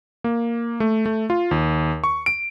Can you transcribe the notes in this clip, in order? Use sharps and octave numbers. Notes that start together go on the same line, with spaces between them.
A#3
A3
A3
F4
D#2
C#6
D7